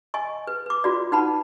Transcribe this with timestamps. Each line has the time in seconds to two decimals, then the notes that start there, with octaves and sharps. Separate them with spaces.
0.14 D#5 G#5 C#6
0.47 B4
0.66 B4 D6
0.84 F4 F#4 D5
1.12 D#4 B4 F#5 A5 B5